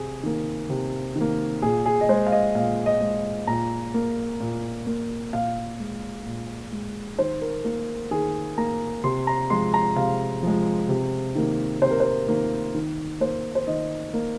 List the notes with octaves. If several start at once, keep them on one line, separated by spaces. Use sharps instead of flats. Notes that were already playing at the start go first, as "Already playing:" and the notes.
Already playing: C3 G#4
D#3 A#3
C3
D#3
A#3
A#2 G#4
G#4
D#5
G#3 C5
F5
D#5
A#2 F5
D#5
G#3
A#2 A#5
A#3
A#2
A#3
A#2 F5
G#3
A#2
G#3
D#3 C5
A#4
A#3 A#4
D#3 G#4
A#3 A#5
C3 C6
A#5
F3 G#3 C6
A#5
C3 F5
F3 G#3
C3
D#3 A#3
C3 C5
A#4
C5
D#3 A#3
D#3
A#3 C5
C5
D#3 D#5
A#3